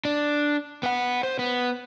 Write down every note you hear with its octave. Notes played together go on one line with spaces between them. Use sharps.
D4
B3 F#5
C5
B3